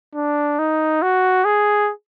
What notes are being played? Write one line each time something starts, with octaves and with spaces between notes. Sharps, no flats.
D4
D#4
F#4
G#4